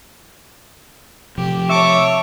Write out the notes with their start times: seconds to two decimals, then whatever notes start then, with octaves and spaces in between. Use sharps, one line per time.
1.38 C3 F3 G4
1.69 C#5 E5 A5 C#6 D6